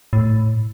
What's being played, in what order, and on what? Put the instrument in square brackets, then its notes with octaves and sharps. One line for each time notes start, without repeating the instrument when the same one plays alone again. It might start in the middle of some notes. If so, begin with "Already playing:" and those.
[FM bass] A2